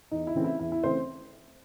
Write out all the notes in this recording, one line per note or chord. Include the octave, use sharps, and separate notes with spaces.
E2 D#4
E4
C#3 E3 A3 C4
E4
E2 E4
E4
C#3 E3 A3 C4 C5